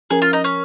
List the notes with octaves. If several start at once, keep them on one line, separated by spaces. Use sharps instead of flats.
F3 C#4 G#4 A#4
F4
D#4
C#4